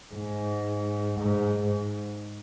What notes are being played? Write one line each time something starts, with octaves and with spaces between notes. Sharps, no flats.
G#2
G#2